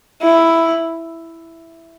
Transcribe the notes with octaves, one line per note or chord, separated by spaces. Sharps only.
E4